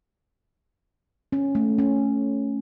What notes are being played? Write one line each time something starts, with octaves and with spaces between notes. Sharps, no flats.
C#4
A3
C#4